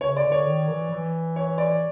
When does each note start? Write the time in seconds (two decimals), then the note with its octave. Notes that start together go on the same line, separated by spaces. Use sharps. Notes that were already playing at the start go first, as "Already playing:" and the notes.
0.01 C#3 C#5
0.17 D5
0.24 D3
0.32 C#5
0.46 D#3
0.69 E3
0.91 E3
1.36 C#5
1.58 D5